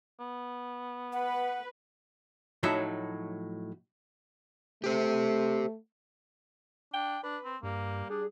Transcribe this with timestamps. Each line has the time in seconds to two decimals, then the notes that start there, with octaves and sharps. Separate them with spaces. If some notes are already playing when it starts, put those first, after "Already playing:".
0.20 B3
1.13 B4 F#5
2.63 A2 F3 F#3 D#4 F#4 E5
4.84 A3 G4 C5
6.93 D4 G5
7.23 D4 B4
7.45 C4
7.63 G2 G3 A#3
8.10 D4 G#4